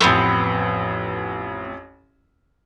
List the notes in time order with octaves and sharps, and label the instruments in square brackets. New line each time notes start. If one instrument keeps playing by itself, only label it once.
[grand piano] A1 F2 [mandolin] A3 B3 C4